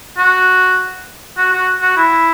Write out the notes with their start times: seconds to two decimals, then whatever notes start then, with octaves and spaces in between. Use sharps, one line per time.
0.18 F#4
1.38 F#4
1.53 F#4
1.82 F#4
1.97 E4